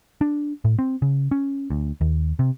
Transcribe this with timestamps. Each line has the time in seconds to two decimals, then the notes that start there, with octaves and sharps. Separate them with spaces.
0.21 D4
0.65 A2
0.79 C4
1.02 C#3
1.31 C#4
1.70 D2
2.01 D#2
2.39 C3